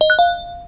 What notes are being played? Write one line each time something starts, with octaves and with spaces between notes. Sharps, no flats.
D#5
F#6
F5